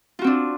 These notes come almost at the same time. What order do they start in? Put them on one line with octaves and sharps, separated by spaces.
F4 F#4 C4 D4